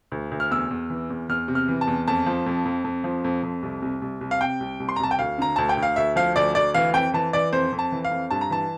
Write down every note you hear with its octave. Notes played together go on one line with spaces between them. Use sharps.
D2
D2
F6
E2 E6
E2
E3
E2
E2 F6
C3
F6
E3
A5
E2
F2 A5
F3
F2
F2
F2
F3
F2
F2
C2
C2
C2
C2
F5
C3 G5
C2
C2
C6
A#5
C2 A5
G5
D2 F5
D3 A#5
D2 A5
G5
D2
F5
D2 E5
F3 F5
D2 D5
D2 D5
E3 F5
F2 G5
E3 A5
E3 D5
F2 C5
F2
A5
E3
F5
F2
G2 A5
A#5
E3 A5